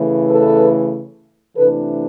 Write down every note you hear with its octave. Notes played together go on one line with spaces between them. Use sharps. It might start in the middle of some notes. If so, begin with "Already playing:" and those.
Already playing: C#3 E3 A3
A4 B4
C3 E3 A3 D4 A4 B4